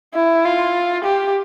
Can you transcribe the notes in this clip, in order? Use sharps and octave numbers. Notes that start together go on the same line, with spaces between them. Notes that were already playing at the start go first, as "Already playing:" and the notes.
E4
F4
G4